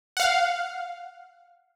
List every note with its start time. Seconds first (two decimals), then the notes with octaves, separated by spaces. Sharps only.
0.17 F5 F#5